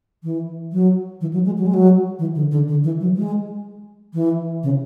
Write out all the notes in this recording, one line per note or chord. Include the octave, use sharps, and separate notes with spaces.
E3
F#3
E3
F#3
G#3
F#3
G#3
F#3
E3
D3
D3
D3
E3
F#3
G#3
E3
C#3